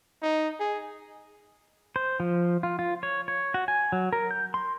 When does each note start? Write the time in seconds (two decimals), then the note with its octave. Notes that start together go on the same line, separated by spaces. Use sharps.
0.22 D#4
0.60 G#4
1.96 C5
2.20 F3
2.63 F4
2.79 F4
3.03 C#5
3.28 C#5
3.54 F#4
3.68 G#5
3.92 F#3
4.13 A#4
4.31 G6
4.54 C6